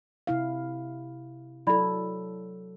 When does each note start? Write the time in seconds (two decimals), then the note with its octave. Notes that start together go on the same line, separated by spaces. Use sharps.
0.27 C3 E4 F5
1.67 F#3 E4 A4 D5 B5